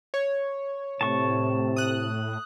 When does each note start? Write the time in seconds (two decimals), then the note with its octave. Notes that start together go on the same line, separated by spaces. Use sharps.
0.14 C#5
1.01 A2 C3 A5 C#6
1.76 D#6 F#6